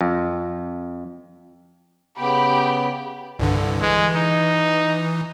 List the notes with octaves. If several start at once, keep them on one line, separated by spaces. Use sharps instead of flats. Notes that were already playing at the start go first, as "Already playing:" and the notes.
F2
C#3 B3 G4 B5
C2 G2 D3
E3 G#3
D#4